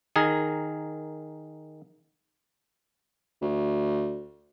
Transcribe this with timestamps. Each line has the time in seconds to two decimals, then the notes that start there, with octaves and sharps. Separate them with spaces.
0.16 D#3 G#4 A#4
3.41 D2